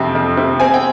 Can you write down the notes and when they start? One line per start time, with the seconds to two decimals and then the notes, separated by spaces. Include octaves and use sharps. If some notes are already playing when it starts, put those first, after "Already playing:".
Already playing: F2 C3
0.15 F2
0.37 C3
0.60 C4 G#5
0.74 G5